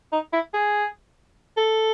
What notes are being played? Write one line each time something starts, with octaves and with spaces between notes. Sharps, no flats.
D#4
E4
G#4
A4